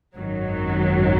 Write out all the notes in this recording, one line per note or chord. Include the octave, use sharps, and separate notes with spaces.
G#1 F#2 D#3 F#3